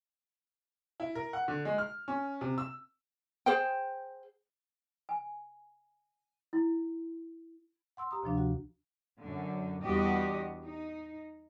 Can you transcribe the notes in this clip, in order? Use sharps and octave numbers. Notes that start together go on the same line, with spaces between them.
E4
A#4
F#5
D3
G#3
F6
C#4
C3
E6
G#4 C5 G5
G#5
E4
F#5 C6 E6
G4 A#5 D#6
D2 C3 F3 D4
F#4 F#5
F#2 D3
E2 G3 D4 F#4 G4 D#5
D#4